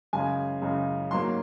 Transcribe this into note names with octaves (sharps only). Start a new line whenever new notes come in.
F#2 C#3 G#3 G#5
F#2 C#3 G#3
G#2 F#3 A#3 C6